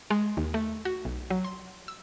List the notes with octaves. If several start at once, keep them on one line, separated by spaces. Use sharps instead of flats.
G#3
D#2
A3
F#4
B1
F#3
C6
E6